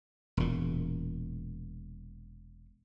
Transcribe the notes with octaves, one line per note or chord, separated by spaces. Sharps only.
E1 A#2